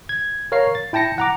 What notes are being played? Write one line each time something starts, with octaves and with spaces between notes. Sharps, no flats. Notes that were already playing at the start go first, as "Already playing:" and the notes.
G#6
A#4 C#5 F5 A#5 C7
A6
E4 G5 A5 A#6 C#7
F#5 A#5 D6